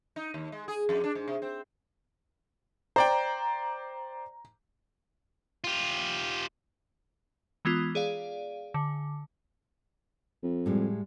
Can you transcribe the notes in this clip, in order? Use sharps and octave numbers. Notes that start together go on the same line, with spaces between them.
D#4
D#2
G#3
G#4
F2
D4
G#2
C3
C4
C5 D5 G5 A#5
F4 G4
E3 G#3 B3 F4
G#4 D5 F5
D3
F2
A2 G3 G#3